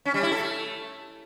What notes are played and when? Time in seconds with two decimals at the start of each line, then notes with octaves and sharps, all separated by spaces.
0.05 C#4
0.14 G3
0.23 E4
0.32 A4
0.40 A3